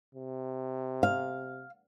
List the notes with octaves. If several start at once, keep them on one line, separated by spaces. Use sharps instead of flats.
C3
F5